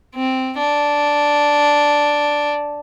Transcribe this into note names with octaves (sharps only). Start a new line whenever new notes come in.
C4
D4